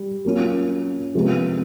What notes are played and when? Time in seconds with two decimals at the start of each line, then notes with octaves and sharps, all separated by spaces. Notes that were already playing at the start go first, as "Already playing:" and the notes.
Already playing: G3
0.25 F#3 A#3 C#4 F4
1.15 C3 F3 G#3 B3